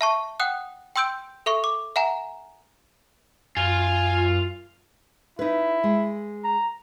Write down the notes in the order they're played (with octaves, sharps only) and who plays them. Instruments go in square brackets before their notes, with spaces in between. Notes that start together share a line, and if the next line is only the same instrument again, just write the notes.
[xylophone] E5 A5 C#6
F#5 G5 D#6 F#6
G5 C6 E6 G6 D7
A4 E5 C#6
D6
E5 F#5 G#5 A#5
[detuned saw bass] F#2 [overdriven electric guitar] F4 F5 [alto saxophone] G#5
[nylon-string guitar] D#4 B4 [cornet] E4
[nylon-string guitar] G#3
[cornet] A#5